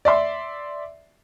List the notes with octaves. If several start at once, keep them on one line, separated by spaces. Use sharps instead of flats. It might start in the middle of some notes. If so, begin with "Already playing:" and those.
D5 E5 C6